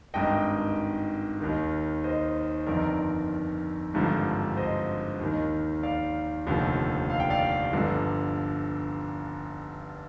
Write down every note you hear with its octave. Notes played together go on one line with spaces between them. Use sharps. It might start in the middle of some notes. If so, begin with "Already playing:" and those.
G#1 G2 D#3 D#5 G5
D#2 D#3
C5 D#5
G1 F2 D#3 A#4 D5
G#1 G2 D3 F3
C5 D#5
D#2 D#3
D5 F5
F1 D#2 D3 F3
F5
G5
D5 F5
G1 G2 D3 F3